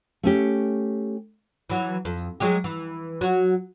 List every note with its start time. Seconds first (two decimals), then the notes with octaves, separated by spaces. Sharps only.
0.23 A3 C#4 G4
1.70 E3 F#3
2.05 F2
2.40 F#3 G#3 G4
2.64 E3
3.21 F#3 F#4